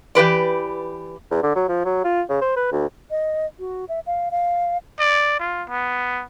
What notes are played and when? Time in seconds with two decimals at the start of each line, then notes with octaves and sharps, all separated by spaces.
0.15 E3 G4 B4 D5
1.31 E2
1.43 D3
1.55 F#3
1.68 F3
1.85 F#3
2.04 F4
2.29 C#3
2.41 C5
2.57 B4
2.72 D2
3.11 D#5
3.59 F#4
3.89 E5
4.06 F5
4.31 F5
4.99 D5
5.39 F4
5.69 B3